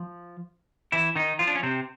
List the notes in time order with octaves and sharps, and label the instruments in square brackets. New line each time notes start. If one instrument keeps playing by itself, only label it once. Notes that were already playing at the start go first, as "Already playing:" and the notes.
Already playing: [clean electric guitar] F3
E3 E4
D#3 D#4
F3 F4
D4
C#4
C3 C4